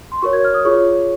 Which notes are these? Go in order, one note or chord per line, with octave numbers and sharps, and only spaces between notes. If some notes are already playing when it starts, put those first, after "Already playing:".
C6
F#4 A#4 C#5 C#6
G#6
F6
D#6
F4 G#4 C#5 C#6